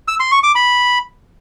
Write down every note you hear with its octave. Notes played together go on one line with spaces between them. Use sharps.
E6
C6
C#6
D6
B5